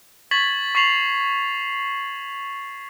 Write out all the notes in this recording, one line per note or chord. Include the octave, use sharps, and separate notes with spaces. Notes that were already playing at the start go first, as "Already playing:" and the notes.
C#6 G#6 A6 B6 F#7
C#6 B6 C7 F7 F#7